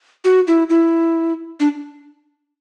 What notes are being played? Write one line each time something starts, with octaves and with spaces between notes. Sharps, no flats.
F#4
E4
E4
D4